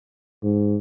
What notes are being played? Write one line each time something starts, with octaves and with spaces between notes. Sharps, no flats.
G#2